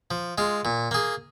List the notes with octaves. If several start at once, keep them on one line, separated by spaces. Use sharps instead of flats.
F3
G#3 F4
A#2
A#3 G#4